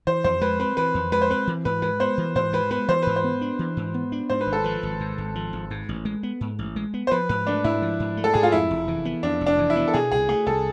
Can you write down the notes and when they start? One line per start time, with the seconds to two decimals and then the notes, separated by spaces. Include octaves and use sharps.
0.07 E3 C5
0.24 F2 C5
0.41 G#3 B4
0.60 C4 B4
0.77 E3 B4
0.95 F2
1.12 G#3 B4
1.22 C5
1.30 C4 B4
1.47 E3
1.65 G#2 B4
1.82 G#3 B4
2.00 B3 C5
2.18 E3
2.35 G#2 C5
2.53 G#3 B4
2.71 B3 B4
2.88 E3 C5
3.02 G#2 B4
3.16 C5
3.24 B3
3.41 D4
3.59 E3
3.77 G#2
3.94 B3
4.12 D4
4.30 G#2 C5
4.41 B4
4.47 G#1
4.53 A4
4.64 F3 B4
4.83 G#1
5.00 G#2
5.18 G#1
5.35 F3
5.53 G#1
5.71 G#2
5.89 A1
6.05 G#3
6.23 B3
6.41 G#2
6.59 A1
6.76 G#3
6.94 B3
7.07 C5
7.11 F3 B4
7.29 G#2 B4
7.47 A3 D4
7.64 G#2 E4
7.82 F3
8.00 G#2
8.17 A3
8.24 A4
8.34 G#2 G#4
8.43 F4
8.52 F2 E4
8.71 F1
8.88 E3
9.05 B3
9.23 F2 D4
9.41 F1
9.46 D4
9.59 E3
9.70 E4
9.76 B3
9.88 A4
9.94 B2 G#4
10.11 C2 G#4
10.29 A3 G#4
10.46 C2 A4